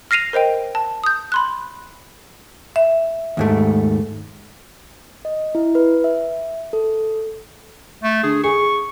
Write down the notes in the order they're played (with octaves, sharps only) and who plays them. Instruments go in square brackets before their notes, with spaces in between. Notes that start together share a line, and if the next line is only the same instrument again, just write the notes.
[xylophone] F6 A#6 C7 D#7 F7
A#4 C5 D#5 G5
A5
D#6 G6
B5 C6 F#6
[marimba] E5
[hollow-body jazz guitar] D#2 G#2 A3
[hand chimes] D#5
E4
B4
E5
A4
[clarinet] A3
[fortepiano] D3 [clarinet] G#4
[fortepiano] G#4 [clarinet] C#6